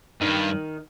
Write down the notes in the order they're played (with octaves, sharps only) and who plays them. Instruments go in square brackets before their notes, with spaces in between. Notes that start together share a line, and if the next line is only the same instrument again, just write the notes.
[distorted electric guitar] G2 [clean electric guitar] D#3 D#4